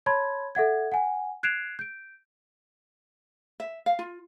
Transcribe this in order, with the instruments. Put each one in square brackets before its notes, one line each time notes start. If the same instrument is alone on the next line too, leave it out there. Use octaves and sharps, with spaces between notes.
[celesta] C#5 A5 B5 C6 G#6
A4 E5 F#5 G#6
F#5 G#5
F#6 G#6 C7 D7 E7 F7
G6 D7
[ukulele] E5
F5
F4